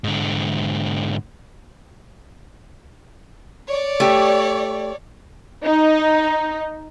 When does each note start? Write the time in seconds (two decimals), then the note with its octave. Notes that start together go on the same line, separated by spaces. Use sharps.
0.04 G#2 D3
3.68 C#5 D5
4.00 A3 G4
5.65 D#4